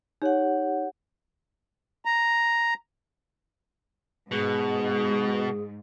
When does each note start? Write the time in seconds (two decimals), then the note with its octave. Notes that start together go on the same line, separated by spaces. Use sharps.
0.22 D#4 G4 C#5 F#5
2.05 A#5
4.31 G#2 B2 G#4